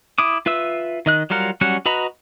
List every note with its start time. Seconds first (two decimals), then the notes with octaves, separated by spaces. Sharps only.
0.18 E4 D6 D#6
0.46 F4 B4 E5 E6
1.06 D#3 D#5 F#6
1.30 F#3 G3 F4 A#4 F#5
1.61 F#3 G3 C#4 F#4 F#5
1.86 F#4 B4 D#5 A#5 B5